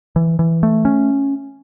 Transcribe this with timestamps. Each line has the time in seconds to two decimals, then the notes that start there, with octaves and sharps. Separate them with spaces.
0.16 E3
0.39 E3
0.63 A3
0.85 C#4